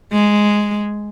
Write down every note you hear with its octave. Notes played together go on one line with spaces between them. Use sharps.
G#3